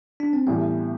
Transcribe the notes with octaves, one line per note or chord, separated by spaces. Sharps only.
D4
C4
A1 A2 E3 G3 B3